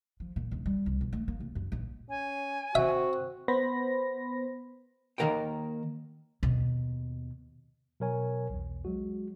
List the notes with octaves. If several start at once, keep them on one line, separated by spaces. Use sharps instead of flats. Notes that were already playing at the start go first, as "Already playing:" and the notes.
F3
A#2
E1
G3
C2
B2
A3
A#3
C2
F#2
A#1
C#4 G#5
C4 F#4 E5
B3 C5 B5 A#6
D#3 A#3 A#4 F#5 G5
D#2 B2
B2 F#3 A#4 C#5 G#5
B1 E2
F#3 G#3 F#4